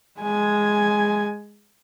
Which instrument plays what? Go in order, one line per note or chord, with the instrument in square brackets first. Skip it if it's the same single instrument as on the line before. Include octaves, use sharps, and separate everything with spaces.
[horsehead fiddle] G#3 G#5